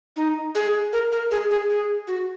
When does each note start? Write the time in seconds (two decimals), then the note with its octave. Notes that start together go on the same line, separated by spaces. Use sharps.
0.16 D#4
0.55 G#4
0.93 A#4
1.12 A#4
1.31 G#4
1.51 G#4
1.70 G#4
2.07 F#4